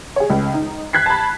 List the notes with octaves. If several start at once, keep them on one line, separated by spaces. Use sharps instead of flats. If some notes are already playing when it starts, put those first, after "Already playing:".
G#4 C#5
C#2
D#4
F#6 G#6 B6 C7
A5 B5